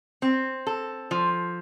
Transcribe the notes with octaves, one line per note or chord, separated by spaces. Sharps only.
C4
A4
F3